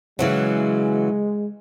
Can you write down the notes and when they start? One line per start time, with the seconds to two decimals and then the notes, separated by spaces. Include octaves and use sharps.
0.19 C#3 E3 F#3 G#3